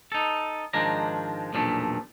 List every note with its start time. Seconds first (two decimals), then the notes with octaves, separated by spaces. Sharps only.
0.12 D#4 A4
0.73 G#2 D#3 F3 G#3 D4 A#5
1.53 B1 E2 A#2 F3 A3 D4